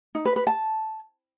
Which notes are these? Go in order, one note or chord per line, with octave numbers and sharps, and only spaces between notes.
D#4
B4
B4
A5